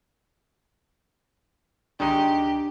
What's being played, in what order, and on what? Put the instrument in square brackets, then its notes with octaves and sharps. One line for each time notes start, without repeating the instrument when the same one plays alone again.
[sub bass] C#2 [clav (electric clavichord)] D#3 G#3 D#4 [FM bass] D4 [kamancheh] G4